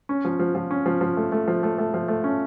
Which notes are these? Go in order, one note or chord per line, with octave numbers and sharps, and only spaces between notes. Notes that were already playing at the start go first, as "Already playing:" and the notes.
C#4
F3
F3
F3
C#4
F3
F3
A3
A3
F3
A3
A3
F3
A3
C#4